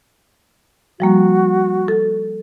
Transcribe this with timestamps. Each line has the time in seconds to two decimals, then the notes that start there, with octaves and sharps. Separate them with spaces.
1.00 F3 G3 A#3 F#4
1.88 A4